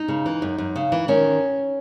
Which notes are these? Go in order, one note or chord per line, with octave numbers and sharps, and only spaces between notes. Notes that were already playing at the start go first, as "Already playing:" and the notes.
Already playing: D#4
C#3
E3
F#2
F#2
C#3
E3
D#3 C#4